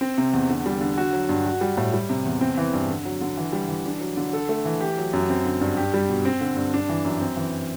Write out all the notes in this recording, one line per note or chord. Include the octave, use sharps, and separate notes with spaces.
C4
C3
E2
D3
G3
D3
F#4
F#3
G2
F#4
G3
A2
G3
C3
E2
C4
E3
G2
D3
F#3
D3
E3
G3
E3
D4
F#3
D3
A4
A3
E3
G4
F#3
F#2
C4
D3
G2
G4
G3
B2
C4
D3
G2
D4
E3
F#2
C4
E3